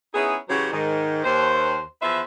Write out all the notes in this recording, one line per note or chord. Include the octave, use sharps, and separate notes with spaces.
B3 C#4 D#4 E4 G#4
C#3 E3 F#3 F#4 G4 C5
G#2 D#3
D#2 C5
E2 F3 B4 C5 E5